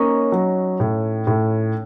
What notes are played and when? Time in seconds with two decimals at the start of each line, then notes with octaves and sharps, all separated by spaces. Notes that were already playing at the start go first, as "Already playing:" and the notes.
Already playing: A#3 C#4 D#4
0.32 F#3
0.80 A2
1.27 A2